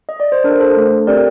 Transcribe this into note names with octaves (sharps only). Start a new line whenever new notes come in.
D#5
D5
C5
D4 A4 A#4
A4 C5
A3 D4 A4
C4 G4 A#4 D5